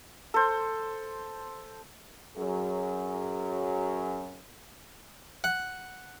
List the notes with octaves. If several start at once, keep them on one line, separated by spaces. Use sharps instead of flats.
A4 C5
F#2 F#3 G#4
F#5